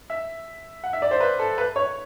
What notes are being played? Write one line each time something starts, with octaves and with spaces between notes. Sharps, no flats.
E5
F#5
E5
D5
C5
B4
A4
B4
C#5